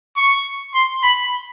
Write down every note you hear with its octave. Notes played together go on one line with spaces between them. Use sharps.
C#6
C6
B5